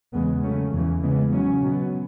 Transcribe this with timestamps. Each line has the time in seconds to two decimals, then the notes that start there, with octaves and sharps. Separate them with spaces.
0.13 E2 C#3 G#3 B3
0.42 C#3 F#3 A3 C#4
0.72 E2 C#3 E3
1.03 C#3 E3 G#3 B3
1.32 C#3 F#3 C#4
1.61 B2 F#3 B3